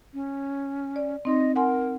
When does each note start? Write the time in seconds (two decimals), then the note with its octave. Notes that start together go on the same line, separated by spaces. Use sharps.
0.14 C#4
0.96 D5
1.25 C4 D#4 D#5 C6
1.56 A#4 F#5 G#5 C6